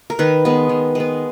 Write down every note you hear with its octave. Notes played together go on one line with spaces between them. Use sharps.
A#4
D#3 B4
G#3 B3
D#3
G#3 B3